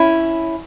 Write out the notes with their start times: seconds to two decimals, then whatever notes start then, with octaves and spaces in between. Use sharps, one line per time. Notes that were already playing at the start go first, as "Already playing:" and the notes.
Already playing: C#4 E4